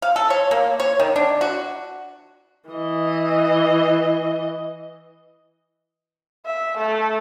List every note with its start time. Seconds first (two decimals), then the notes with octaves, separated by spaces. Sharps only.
0.02 F5
0.16 A4
0.30 C#5
0.51 A#3
0.80 C#5
1.00 D#3
1.16 D4
1.41 F#4
2.70 E3 D#5
6.46 E5
6.78 A3